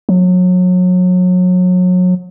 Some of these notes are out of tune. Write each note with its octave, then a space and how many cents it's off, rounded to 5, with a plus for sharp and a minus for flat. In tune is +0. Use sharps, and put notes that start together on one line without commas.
F#3 -30